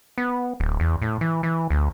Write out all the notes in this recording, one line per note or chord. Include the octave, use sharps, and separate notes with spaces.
B3
D1
E2
A2
E3
E3
D2